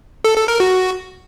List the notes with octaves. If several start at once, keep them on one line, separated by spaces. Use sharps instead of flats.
A4
A4
A#4
F#4